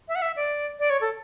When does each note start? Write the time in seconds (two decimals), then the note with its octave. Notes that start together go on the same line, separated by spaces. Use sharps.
0.08 E5
0.15 F#5
0.22 E5
0.36 D5
0.79 D5
0.90 C#5
1.01 A4